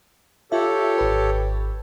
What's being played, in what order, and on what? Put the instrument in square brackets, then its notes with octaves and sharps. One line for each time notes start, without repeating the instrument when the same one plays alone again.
[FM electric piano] F4 E5 [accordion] G4 A4 C#5
[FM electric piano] G#1 B4